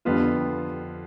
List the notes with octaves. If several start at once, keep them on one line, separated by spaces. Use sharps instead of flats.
F2 D3 G3 B3 F4